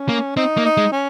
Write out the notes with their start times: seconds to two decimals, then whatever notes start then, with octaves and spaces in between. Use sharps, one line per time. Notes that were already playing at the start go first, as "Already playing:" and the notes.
Already playing: C#4
0.09 A#3
0.37 C4 D#4
0.57 A#3
0.65 D#4
0.77 G#3
0.92 C#4